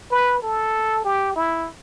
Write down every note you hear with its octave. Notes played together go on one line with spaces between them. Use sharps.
B4
A4
G4
E4